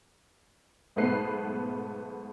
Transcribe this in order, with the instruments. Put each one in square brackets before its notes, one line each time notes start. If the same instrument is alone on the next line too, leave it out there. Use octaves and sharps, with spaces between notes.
[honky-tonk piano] B1 G#2 A3 B3 B4 C7